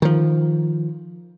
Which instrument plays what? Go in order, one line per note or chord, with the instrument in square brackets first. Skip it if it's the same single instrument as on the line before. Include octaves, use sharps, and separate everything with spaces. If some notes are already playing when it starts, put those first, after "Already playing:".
[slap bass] D#3 F3